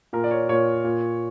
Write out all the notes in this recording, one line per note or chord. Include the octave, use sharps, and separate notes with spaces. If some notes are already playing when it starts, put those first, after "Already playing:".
A#2 A#4
D5
C#5
A#2 C#5
A#2